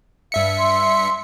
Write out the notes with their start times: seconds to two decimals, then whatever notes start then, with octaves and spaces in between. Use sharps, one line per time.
0.32 G2 E5 F5 C#7
0.57 C6